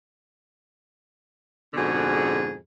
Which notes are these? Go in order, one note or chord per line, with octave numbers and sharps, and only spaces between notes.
F2 G#2 B2 D3 F#4 G#4